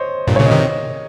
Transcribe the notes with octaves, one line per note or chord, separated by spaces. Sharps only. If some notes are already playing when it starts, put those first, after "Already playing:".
Already playing: C5 C#5 D#5
G2 A#2
C#5
A#2 C#3
D#5
C3 D#3